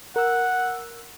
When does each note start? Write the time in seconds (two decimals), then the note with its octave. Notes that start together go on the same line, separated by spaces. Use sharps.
0.16 A#4 F#5 E6